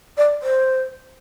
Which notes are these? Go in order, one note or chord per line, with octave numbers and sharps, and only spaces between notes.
D5
C5